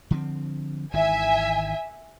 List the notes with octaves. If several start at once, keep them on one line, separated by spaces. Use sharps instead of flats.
D3 F3 C4
G#1 D#3 E3 E5 G#5